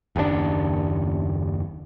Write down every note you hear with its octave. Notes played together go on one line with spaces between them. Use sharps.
F#1 D#2 B2 D4